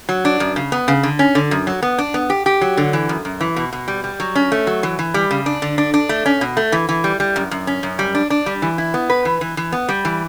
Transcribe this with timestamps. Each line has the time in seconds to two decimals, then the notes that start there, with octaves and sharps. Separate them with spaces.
0.09 F#3
0.25 D4
0.40 F#2
0.56 C#3
0.72 B3
0.88 C#3
1.03 D3
1.19 C#4
1.35 D3
1.51 F#2
1.67 F#3
1.82 B3
1.98 D4
2.14 B3
2.30 G4
2.46 G4
2.61 F#3
2.77 D3
2.93 E3
3.09 F#2
3.25 F#2
3.40 E3
3.56 B2
3.73 B2
3.88 G3
4.04 G3
4.20 F#3
4.35 C#4
4.52 A3
4.67 F#3
4.83 E3
4.99 E3
5.14 G3
5.31 C#3
5.46 D4
5.62 D3
5.78 D4
5.94 D4
6.09 A3
6.26 C#4
6.41 B2
6.57 A3
6.72 E3
6.89 E3
7.04 G3
7.20 G3
7.36 F#2
7.51 F#2
7.67 C#4
7.83 F#2
7.99 G3
8.15 D4
8.30 D4
8.46 G3
8.62 E3
8.78 E4
8.94 B3
9.10 B4
9.25 E3
9.41 E3
9.57 E3
9.72 B3
9.89 G3
10.05 E3